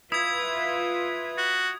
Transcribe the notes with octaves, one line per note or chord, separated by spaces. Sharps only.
E4 F4 B4 E5 D#6 G#6
F#4